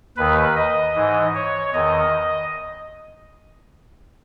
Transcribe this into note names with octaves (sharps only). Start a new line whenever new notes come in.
D#2 D#3 B4
D#5
G#2 E3
C#5
E2 D#3 D#5